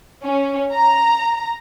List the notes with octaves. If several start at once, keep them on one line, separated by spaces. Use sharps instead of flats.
C#4
A#5